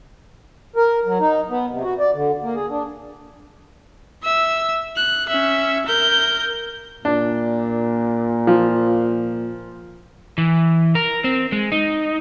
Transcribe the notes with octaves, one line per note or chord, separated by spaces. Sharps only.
A#4
F#3
D#4
B3
C3
F#4
D5
D3
A#3
G#4
D4
E5 E6
F#6
C#4 E5
A#4 G6
A#2 D4
F3
E3
A#4
C4
G#3
D#4